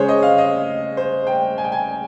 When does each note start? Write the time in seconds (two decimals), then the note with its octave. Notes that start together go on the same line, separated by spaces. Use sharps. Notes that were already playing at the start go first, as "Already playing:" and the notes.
Already playing: C#3 G#3 G#4 C5 C#5
0.08 D#5
0.23 F5
0.38 D#5
0.97 C5
1.27 G5
1.58 G#5
1.64 G5
1.72 G#5